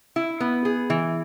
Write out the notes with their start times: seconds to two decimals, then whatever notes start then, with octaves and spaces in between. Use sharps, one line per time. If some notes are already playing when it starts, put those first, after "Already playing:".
0.16 E4
0.40 B3
0.65 G#4
0.90 E3